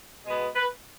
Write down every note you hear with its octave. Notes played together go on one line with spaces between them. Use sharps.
B2 G#3 B3 G#4
B4